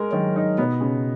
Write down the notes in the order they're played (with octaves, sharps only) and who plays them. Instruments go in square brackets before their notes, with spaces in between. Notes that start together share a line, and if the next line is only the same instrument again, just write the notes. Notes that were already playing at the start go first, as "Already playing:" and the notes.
Already playing: [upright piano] G#3 A#4
[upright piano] D#3 [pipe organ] F#3
[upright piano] D#4
[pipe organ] B2 [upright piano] B3
[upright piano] C#3